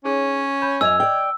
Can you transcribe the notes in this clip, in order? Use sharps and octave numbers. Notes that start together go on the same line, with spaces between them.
C#4 D#4 G#4 C#5
C#5 B5 G6
F#2 D#5 G#5 E6 G#6 F7
D5 G5